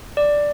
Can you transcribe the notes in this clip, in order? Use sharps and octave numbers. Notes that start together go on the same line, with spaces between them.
D5